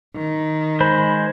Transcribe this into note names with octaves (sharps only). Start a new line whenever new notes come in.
D#3
G#3 C5 B5